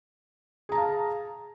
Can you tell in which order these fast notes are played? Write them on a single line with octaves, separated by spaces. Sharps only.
G#4 A#5 A5 F5